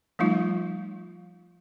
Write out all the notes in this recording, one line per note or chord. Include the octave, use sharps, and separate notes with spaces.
F3 G3 A3 D#4 F4